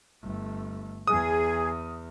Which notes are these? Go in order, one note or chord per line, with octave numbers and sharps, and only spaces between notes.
G1 A3
E2 G#4 D#6